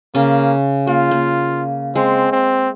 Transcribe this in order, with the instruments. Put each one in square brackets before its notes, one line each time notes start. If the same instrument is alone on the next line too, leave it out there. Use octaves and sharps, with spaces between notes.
[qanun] C#3 C#4 [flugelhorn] A#3
[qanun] A#3 [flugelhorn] F4
[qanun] A#3
[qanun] G#3 [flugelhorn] C4
[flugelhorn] C4